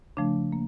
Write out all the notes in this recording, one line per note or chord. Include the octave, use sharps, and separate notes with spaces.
C#3 F3 A3 D4
A#3